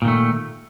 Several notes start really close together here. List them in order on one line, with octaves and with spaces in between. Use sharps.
A#2 D#3 A3